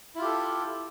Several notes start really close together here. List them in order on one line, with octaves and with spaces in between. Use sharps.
E4 F4 G4 A4